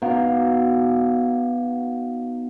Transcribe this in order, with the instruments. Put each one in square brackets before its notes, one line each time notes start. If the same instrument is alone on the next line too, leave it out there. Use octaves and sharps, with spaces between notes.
[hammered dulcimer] B2 D#4 F5